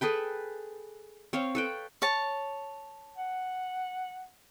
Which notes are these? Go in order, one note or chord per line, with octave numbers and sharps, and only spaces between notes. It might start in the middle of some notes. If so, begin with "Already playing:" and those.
G#4 A4 B4 G5
C4 C#5 F5
A4 B4 G5
C#5 A5
F#5